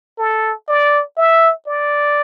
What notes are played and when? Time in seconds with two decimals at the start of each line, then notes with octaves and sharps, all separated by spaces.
0.18 A4
0.68 D5
1.17 E5
1.67 D5